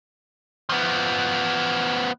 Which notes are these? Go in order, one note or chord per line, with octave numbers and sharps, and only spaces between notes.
F3 B3